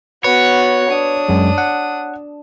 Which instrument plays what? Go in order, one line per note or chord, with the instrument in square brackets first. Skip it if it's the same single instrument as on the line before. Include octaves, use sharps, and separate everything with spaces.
[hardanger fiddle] B3 F#4 [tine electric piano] B4 [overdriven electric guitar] C#5
[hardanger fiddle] D4 D#6
[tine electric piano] F#2 G#3
F#5